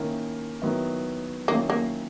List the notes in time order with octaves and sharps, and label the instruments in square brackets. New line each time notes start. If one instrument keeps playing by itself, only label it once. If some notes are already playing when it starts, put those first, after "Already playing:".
Already playing: [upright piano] D#3 A#3 C#4 E4
D#3 F#3 B3 E4
[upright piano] D#3 F#3 C#4 E4 [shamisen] A#3
[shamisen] A#3